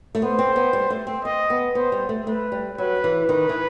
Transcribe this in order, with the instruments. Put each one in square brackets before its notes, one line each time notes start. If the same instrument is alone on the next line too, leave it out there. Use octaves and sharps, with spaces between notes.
[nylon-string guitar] A3
[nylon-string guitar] B3 [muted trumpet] C5
[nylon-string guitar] C4
B3
G3
A3
C4
[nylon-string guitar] C4 [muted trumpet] D#5
[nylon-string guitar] B3
[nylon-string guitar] B3 [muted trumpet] C5
[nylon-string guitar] G3
A3
[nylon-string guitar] A3 [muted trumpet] B4
[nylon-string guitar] G3
[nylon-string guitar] F#3 [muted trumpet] B4
[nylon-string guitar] E3
[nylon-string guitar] D#3 [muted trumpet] B4
[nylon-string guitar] E3